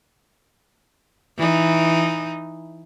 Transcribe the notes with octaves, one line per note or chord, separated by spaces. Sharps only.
E3 D#4